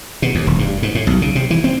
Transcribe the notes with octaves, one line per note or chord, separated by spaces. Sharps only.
B2
D#2
E1
G2
G#2
A2
B1
C#3
C3
E3
C4